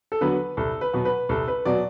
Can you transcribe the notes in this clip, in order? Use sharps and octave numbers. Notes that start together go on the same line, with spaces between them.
A4
D3 F#3 B3 B4
C2 A4
B4
B2 F#3 B3
B4
C2 A4
B4
B2 F#3 B3 D5